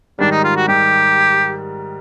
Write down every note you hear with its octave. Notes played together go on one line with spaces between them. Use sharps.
G#2 D#3 G3 D4
D#4
F4
F#4
G#2 D#3 G3 G4